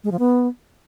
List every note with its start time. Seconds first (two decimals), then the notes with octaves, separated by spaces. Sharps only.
0.04 G#3
0.11 F3
0.19 B3